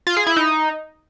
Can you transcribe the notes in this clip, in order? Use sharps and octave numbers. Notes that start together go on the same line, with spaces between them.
F4
G#4
E4
D#4